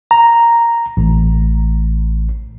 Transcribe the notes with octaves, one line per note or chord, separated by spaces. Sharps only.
A#5
A1